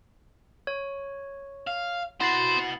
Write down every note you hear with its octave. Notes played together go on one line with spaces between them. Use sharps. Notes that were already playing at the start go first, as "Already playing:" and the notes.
C#5
F5
B3 C4 E4 F#4 C5 A6 C7